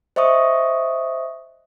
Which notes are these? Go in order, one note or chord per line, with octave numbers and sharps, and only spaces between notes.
C5 D#5 E5 C#6 D#6